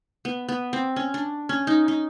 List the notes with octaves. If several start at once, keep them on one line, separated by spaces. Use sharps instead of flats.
B3
B3
C4
C#4
D4
C#4
D#4
D#4